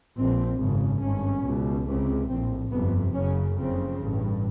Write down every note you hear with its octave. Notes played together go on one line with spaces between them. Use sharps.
A#1 A#2 C4
G#1 F#2 C#3
G#1 G2 C#4
C#2 B2
C#2 C3
A#1 A2 C4
G1 F2 C3 B3
F#1 F#2 C#3 C#4
F#1 F2 C#3 C4
A1 G2